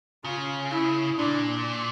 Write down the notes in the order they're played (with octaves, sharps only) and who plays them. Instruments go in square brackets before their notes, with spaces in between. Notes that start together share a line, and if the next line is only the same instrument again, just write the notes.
[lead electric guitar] C#3 [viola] F4
[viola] E4
[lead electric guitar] A#2 [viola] D4